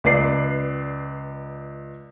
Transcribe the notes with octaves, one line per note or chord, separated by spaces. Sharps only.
C#2 B4 D5 C7